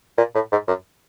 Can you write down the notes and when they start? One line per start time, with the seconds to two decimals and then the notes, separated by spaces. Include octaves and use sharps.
0.18 A#2
0.35 A2
0.52 G#2
0.68 F#2